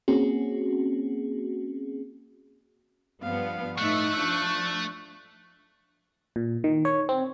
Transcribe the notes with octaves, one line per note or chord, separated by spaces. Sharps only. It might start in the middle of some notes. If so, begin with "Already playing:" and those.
A#3 C4 C#4 F#4 G#4
G2 F3 B3 F5
A2 A3 D#4 E5 C#6 F#6
F3 D4
A#2
D#3
C#5
C4